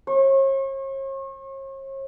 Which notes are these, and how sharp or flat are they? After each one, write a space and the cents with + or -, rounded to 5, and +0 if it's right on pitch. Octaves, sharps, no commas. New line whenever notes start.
C#5 -40